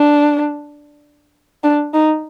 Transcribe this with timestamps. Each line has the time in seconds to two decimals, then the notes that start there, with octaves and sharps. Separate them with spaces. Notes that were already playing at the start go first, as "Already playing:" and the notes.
Already playing: D4
1.64 D4
1.94 D#4